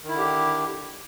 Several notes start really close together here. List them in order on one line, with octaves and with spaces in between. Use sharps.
D#3 E4 D3 G4